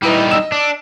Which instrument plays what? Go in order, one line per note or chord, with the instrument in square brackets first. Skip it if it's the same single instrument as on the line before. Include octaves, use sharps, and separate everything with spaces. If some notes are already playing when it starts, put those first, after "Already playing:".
[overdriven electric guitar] G3 D#4 [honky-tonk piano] E4 B4 D#5
[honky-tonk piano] D#5 E6 E7
[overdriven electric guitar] D4